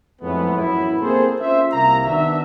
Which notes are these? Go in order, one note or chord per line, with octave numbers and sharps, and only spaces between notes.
F2 A2 F#3 G#3 A3 B3
A1 F#2 B3 E4
A#3 C4 G#4 A4 C5
C#4 F4 C5 E5
C2 C3 A#3 A#5
D#3 B3 D4 F#4 E5